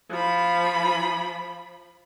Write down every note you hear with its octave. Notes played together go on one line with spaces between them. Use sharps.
F3 B5